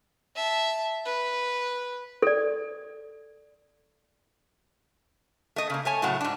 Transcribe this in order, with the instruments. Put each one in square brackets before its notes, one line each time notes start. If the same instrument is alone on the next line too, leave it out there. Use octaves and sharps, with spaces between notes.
[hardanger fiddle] E5 A5
B4
[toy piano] A4 D5
[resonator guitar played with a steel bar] A3 D#5
C#3 A#3
A3 C#5 G#5
A2 C#3 F#3 A3 F#5
G#2 D4